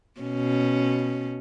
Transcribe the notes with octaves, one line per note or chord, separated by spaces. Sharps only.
B2 C#4